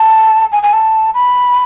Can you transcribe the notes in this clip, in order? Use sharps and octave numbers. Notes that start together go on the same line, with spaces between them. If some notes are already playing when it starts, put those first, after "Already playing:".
Already playing: A5
G#5
G#5
A5
B5